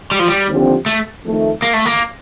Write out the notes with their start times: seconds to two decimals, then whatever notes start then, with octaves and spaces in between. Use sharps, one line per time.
0.11 G3
0.19 F3
0.28 G3
0.48 D#2 D3 F3 C4 G4
0.86 A3
1.24 F2 D#3 A3
1.62 A#3
1.73 A3
1.86 A#3